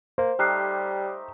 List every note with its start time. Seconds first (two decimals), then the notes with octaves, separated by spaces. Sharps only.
0.18 A#3 C5
0.39 G3 A3 D#4 G4 F6 F#6 C7